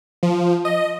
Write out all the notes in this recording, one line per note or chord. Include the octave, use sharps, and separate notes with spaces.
F3
D#5